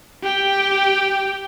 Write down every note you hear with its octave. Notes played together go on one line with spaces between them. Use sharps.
G4 G5